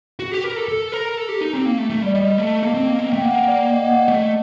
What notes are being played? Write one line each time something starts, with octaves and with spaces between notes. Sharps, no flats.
F#4
G4
A#4
A4
A4
A#4
A4
G4
D#4
C4
A#3
A3
A3
G3
D5
G3 D#5
A3
A#3
C4
A#3
C4
A#3
A3 G5
A#3 F#5
F#5
D5
D5
D#5
F#5
D#5
A3